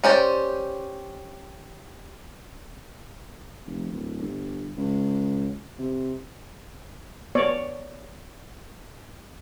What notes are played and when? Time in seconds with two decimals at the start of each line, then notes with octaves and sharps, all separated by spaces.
0.04 C#4 G4 C5 D5
3.66 F1
3.91 D1
4.22 G1
4.77 C#2
5.79 C3
7.35 B3 C#5 D5